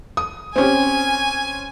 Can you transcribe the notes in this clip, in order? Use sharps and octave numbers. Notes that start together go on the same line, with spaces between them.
D#6
C4 C#4 G4 G#5